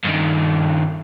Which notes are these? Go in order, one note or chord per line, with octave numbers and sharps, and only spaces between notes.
G2 D#3